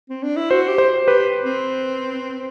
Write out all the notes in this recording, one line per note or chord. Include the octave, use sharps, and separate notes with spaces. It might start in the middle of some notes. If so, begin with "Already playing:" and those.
C4
D4
E4
F#4 C5
G4
C5
G4 B4
C4